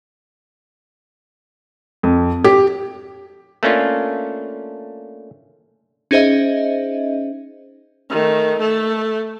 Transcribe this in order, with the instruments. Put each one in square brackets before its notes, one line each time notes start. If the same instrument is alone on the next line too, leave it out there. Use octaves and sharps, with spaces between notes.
[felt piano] F2
G4
[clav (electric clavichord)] A3 A#3 C#4 D4 F4
[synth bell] C#4 D#4 G#4 C5 D#5 E5
[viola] D#3 A3
A3 A4